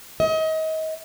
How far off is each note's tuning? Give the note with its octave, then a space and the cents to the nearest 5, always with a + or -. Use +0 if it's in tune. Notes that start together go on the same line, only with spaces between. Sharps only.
D#5 +30